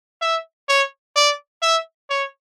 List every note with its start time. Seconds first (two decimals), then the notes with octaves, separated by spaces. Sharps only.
0.22 E5
0.69 C#5
1.16 D5
1.62 E5
2.10 C#5